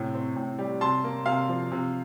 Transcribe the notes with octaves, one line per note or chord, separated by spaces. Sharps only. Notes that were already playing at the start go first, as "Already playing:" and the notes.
Already playing: A2 C3
C4
A2
G3
C3 A5 C6
A#3
C3 F5
F3
C3